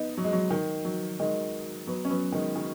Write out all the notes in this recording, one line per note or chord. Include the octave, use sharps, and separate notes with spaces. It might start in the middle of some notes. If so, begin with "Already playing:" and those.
Already playing: B3 D#4
F#3
G#3
F#3
D#3
F#3
D#3 G#3
F#3 B3
C#4
F#3 B3
D#3 G#3
D#3